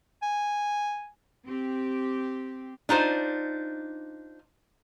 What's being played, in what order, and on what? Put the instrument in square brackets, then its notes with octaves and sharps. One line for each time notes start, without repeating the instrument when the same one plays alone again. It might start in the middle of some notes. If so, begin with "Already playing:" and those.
[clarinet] G#5
[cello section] C4 G4
[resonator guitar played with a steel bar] D4 D#4 F4 C5